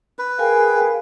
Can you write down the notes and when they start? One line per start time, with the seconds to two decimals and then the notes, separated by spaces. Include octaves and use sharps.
0.19 B4
0.39 G#4 A#4 F5 G5 G#5